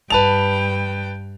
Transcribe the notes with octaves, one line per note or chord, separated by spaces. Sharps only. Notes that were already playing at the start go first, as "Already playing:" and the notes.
G2 B4 G5 A5 F7